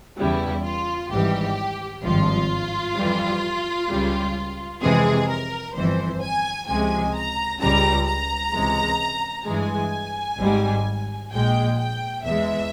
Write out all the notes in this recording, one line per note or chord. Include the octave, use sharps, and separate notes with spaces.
E2 C#3 G3 E4
F4
G#1 G#2 E3 G3 G4
G#1 G2 F3 F4
F2 E3 G3
C#2 C#3 G3
F2 C3 E3 G#3 G#4
A#4
G1 F2 E3 C5
G#5
C#2 C3 F3 G#3 G#5
A#5
C#2 C#3 G3 A#5
A#5
C#2 C3 E3 G#3
G2 E3 G#3 G#5
G#1 G#2 G3
A#1 A#2 G#3 G5
G5
E2 E3 G#3 E5